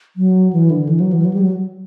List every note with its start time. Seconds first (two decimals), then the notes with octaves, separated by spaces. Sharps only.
0.16 F#3
0.53 E3
0.71 D3
0.89 E3
1.00 F#3
1.12 E3
1.24 F#3
1.33 G3
1.42 F#3